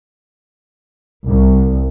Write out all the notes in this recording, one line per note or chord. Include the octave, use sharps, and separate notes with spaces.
C2